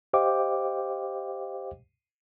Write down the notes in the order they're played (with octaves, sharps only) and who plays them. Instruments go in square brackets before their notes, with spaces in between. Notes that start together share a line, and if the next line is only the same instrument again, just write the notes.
[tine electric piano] G4 C5 D#5 F5 G5 D6